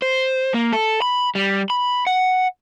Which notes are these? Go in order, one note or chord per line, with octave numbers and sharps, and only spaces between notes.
C5
A#3
A4
B5
G3
B5
F#5